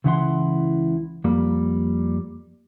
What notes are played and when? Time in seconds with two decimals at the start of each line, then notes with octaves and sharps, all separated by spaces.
0.04 C#2 C#3 E3 E4 F#5 C6
1.24 F2 G3 A#3